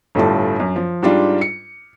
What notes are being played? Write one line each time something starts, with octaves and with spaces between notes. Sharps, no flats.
G1 A2 G3 F4 A5
F#2
F3
G#2 G3 D4 F4
C#7